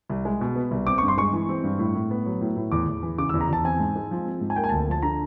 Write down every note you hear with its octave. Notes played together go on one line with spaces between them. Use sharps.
C2
G#3
B2
B3
C2
C4 D6
G2 C#6
C6
G#3 C#6
E3
C4
G2
A2
A2
B3
F#3
A2
A2
E2 D6
E2
E3
C#3 D6
E6
E2
A#5
E2 A5
C4 G#5
G#2
G#3
F3
C4
G#2
G#5
A#3 G5
G#5
D2 A5
F3 A5
D3 A#5